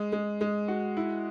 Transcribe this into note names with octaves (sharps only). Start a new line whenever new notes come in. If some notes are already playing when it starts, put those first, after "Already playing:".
Already playing: G#3
G#3
G#3
F#4
E4